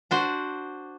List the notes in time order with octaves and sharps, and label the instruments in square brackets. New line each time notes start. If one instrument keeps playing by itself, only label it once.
[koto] D4 F#4 C5